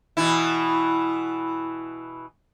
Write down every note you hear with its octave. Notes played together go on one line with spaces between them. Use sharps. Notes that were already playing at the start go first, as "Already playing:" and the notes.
B2 E3 E4